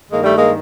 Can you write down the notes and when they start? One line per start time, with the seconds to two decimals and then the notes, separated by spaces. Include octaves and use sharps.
0.10 G2 D#3 G#3 A#3
0.23 G3 A3
0.36 G#3 A#3